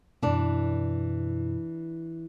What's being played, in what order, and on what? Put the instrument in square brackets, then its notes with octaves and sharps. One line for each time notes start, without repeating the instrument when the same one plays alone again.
[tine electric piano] F#2 B2 [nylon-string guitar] E3 D4